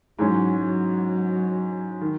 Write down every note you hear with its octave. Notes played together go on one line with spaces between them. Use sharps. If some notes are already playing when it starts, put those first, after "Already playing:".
G#2 E3 F#3 G#3 C#4
F#3
D#3